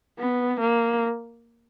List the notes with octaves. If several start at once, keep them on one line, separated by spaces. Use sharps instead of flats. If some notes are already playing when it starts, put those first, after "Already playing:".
B3
A#3